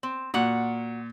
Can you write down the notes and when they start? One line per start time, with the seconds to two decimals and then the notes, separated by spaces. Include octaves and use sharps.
0.03 C4
0.34 A#2 F#4 F#5